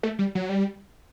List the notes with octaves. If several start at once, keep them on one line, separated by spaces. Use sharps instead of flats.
A3
G3
F#3
G3